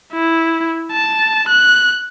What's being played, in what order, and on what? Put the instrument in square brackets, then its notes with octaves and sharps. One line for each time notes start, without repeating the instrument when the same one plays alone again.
[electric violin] E4
A5
F#6